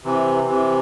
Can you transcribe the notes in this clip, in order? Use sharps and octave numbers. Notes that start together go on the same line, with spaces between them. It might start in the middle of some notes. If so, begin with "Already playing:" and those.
C3 E3
C3 E3